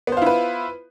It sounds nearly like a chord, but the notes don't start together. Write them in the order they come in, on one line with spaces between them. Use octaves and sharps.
B3 C5 F4 E4 B4